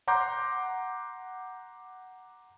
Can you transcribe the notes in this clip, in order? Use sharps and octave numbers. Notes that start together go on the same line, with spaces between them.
F#5 A#5 C6 D6 G6